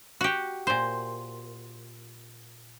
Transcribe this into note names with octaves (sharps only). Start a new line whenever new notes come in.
F#4 G4
A#2 C5